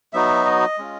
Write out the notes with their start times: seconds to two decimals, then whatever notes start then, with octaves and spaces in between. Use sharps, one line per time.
0.13 F#3 B3 D#4 F#4 E5
0.46 D#5
0.78 G#3 C#4 F4